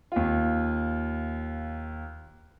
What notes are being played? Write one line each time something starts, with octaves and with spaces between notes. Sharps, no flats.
D#2 F4